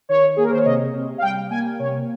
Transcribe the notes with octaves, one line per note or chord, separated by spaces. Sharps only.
D#3 C#5
A#3 G#4
A#4
C5
C#5
C3 D#5
C3
F5
G3 G5
A#3 G#5
C3 C#5